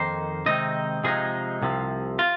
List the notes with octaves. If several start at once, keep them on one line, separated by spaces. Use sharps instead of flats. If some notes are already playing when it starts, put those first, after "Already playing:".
Already playing: F2 D#3 A#3 D#4 C5
C3 D#3 G#3 C4 D#4 D#5
C3 F3 G#3 C4 D#4 G#4
C2 C3 F3
F4